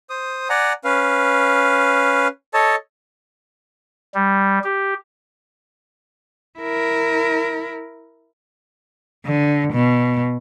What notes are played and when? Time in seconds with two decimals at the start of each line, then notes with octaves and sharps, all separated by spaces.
0.10 C5 D#6
0.50 D5 F#5 G#5 A#5
0.84 C#4 B4 F5
2.54 A4 C#5 D#5 A5
4.14 G3
4.64 G4
6.59 E4 A#4
9.25 D3
9.73 B2